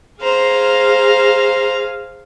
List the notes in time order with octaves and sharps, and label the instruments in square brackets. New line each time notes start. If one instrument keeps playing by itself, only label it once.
[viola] G#4 F5 [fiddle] C5 A#5